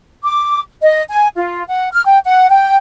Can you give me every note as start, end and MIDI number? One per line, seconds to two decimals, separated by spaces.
0.23 0.59 86
0.82 1.03 75
1.10 1.26 80
1.36 1.64 65
1.68 1.88 78
1.92 2.05 89
2.05 2.18 79
2.24 2.49 78
2.49 2.77 79